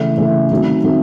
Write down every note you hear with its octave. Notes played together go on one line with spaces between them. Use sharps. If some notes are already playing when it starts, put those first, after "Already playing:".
Already playing: C#3 E3 A3
C#3 E3 A3
D#3 F#3 A3 C4
D#3 F#3 A3 C4